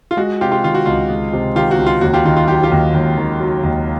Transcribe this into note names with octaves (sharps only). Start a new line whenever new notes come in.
F4
G#3 F#4
C3 F4 G4
F4 G4
D#3 F4
F#4
C#2 F4
G#3
C3
D#3 F4 G4
F#4
C#2
F4
D#2 F#4
F4 G4
D#3 F4
F4
F#3 F4 G4
F4 G4
D#2
D#2
D#3
F#3
D#2